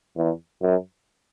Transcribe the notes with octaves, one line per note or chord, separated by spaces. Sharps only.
E2
F#2